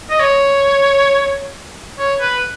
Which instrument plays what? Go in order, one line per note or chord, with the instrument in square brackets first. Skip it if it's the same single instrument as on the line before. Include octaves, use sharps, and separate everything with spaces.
[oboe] D#5
C#5
C#5
B4